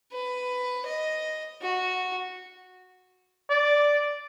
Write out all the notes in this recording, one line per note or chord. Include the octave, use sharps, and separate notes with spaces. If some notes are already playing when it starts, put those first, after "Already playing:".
B4
D#5
F#4
D5